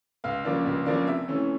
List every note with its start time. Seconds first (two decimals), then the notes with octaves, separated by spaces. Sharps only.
0.24 C#2 F5
0.45 C#3 F3 A#3 D4
0.66 C#2
0.86 C#3 F3 A#3 D4
1.07 C3 E5
1.28 E3 A3 C#4